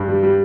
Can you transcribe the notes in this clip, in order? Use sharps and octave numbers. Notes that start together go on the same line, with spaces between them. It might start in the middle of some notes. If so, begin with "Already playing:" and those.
Already playing: G2
G3
G3